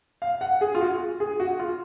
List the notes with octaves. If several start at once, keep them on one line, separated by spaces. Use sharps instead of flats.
F5
F#5
G#4
F4
F#4
G#4
F#4
F4